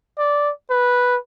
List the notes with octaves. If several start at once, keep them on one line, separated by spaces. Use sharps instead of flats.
D5
B4